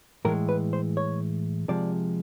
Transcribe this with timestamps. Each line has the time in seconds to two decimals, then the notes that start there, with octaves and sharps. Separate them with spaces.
0.25 A2 E3 G#3 A#4
0.49 B4
0.73 C5
0.97 C#5
1.69 C3 F3 G#3 D5